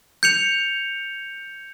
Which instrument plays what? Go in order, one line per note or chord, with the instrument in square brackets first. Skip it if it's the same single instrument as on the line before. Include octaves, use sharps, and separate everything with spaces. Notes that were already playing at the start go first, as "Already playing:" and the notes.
[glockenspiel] G6 C#7 F7